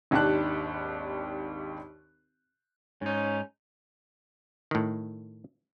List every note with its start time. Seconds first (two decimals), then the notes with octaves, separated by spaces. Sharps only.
0.11 G#1 D#2 D4 G4 A5 F#6
3.02 G#2 C#4 D#4
4.71 A2 D#3